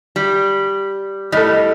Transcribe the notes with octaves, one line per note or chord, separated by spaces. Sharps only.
G3
A2 G3 A4 D#5